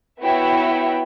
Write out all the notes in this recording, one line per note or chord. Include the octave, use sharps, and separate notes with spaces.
B3 E4 F#4 C#5 E5 G5